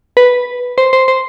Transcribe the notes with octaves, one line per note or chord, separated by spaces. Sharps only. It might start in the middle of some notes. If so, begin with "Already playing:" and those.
B4
C5
C5
C5